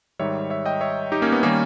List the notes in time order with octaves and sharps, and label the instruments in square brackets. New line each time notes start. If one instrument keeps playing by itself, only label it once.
[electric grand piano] G#2 D#3 G3 C#5 E5
C#5 E5
D#5 G5
C#5 E5
D#4 G4
A#3 C#4
B3
D#3 G3 A#3 C#4